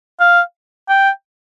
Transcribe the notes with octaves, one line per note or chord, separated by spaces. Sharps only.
F5
G5